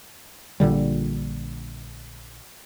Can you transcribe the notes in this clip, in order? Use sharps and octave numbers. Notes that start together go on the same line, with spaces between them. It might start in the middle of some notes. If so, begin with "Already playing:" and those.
A#1 A#2 D3 G3